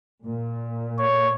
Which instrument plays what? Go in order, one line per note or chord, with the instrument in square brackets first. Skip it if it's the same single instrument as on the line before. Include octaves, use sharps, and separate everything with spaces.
[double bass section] A#2
[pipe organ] C#5